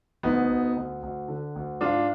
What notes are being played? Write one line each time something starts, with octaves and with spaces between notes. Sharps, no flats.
D2 B3 D#4
D2
D2
D2
D3
D2
G#2 D4 F4